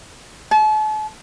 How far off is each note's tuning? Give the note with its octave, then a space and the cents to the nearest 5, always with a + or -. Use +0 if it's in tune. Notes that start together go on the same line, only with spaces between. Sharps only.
A5 -40